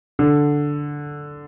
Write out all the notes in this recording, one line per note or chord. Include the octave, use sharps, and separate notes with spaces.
D3